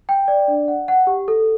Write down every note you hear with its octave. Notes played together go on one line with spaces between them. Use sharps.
G5
D5
D4
F#5
F#5
G4
A4